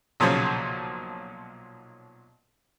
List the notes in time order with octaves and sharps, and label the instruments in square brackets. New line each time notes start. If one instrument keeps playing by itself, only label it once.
[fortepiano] B1 A#2 C#3 F3 F#3 C5